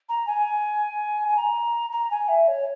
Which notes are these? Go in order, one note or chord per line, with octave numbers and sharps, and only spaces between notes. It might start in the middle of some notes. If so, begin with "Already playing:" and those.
A#5
G#5
G#5
A#5
A#5
G#5
E5
C#5